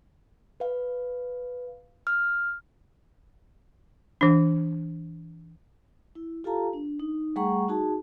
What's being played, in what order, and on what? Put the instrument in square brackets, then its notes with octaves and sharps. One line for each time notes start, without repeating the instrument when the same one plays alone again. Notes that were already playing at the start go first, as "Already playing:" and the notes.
[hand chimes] B4 F5
F6
[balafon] E3 D4
[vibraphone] E4
F4 G4 A4 F5 A5 A#5
D4
D#4
G3 A3 G#4 F#5 A#5 C#6
D#4 F#4 G#4 A5